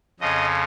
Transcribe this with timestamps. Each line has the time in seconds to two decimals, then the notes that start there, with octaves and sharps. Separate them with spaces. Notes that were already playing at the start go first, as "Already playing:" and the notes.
0.20 F2 C#3 F3 D#5